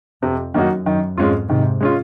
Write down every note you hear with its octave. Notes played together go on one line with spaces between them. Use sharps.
F2 C3
F#2 D#3 A#3 D#4 F#4
F#2 D#3
F2 G#2 G#3 C#4 F4
G#2 C3 D#3
G#3 C#4 F4